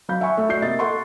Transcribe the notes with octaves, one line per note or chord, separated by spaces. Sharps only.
F#3 F5 B5 G6
E5 F#5 G#5 B5 C#6
A3 E5
F#4 D5 G6 C7
C3 A#3 A#4 D#5 E5 A6
A4 F#5 C6 C#6